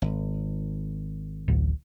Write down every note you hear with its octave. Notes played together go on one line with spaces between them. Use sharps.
G#1
D1 A1